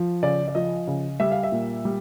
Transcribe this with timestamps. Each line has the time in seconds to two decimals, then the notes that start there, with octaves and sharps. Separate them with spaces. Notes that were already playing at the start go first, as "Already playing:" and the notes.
Already playing: F3
0.23 C#3 D5
0.48 D5
0.55 F3 D#5
0.87 C#3
1.20 G3 E5
1.31 F5
1.43 E5
1.52 A#2
1.85 G3